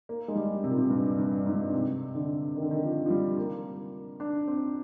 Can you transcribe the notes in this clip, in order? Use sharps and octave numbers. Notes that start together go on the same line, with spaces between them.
A#3
G#3
G3
C3
A#2
C3
G2
G2
G#2
G2
G#2
C3
D3
D#3
D3
D#3
F3
F3
G3
A#3
D4
C4